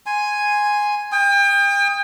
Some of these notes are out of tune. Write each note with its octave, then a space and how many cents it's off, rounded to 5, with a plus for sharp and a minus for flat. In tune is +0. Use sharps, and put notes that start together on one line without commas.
G#5 +0 C6 +0
G5 +35 D#6 +0